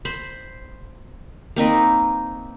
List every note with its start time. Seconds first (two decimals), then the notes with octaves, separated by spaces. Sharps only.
0.05 C5 B5
1.56 A#3 C4 D#4 B4